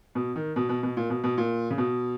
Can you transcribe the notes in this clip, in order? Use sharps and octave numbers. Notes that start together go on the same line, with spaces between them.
B2
D#3
B2
B2
B2
A#2
B2
B2
A#2
C#3
B2